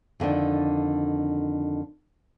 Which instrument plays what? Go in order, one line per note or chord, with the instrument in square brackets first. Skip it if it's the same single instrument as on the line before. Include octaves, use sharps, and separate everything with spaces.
[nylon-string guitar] F2 D3 D#3 D4